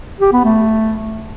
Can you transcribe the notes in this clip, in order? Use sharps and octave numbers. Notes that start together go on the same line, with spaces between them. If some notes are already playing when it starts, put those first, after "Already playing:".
G4
B3
A3